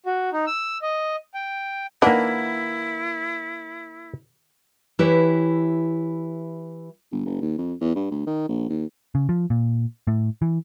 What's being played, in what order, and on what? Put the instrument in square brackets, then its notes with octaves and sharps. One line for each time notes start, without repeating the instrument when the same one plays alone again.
[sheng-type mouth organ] F#4
D#4
E6
D#5
G5
[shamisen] D#3 D4 [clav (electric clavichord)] A#3 B4 [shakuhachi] E4 [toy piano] F#5 B5
[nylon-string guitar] E3 E4 G4 B4 C#5
[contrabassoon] G1
F#1
D#2
F2
E2
G2
D2
D#3
A#1
D#2
[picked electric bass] C#3
F3
A#2
A2
E3